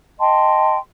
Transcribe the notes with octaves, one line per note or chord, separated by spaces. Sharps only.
D#5 G5 A5 C6